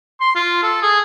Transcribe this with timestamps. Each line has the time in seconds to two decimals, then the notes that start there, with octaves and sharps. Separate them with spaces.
0.21 C6
0.35 F4
0.63 A4
0.82 G#4